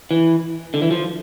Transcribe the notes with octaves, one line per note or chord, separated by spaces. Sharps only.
E3
D3
E3
F3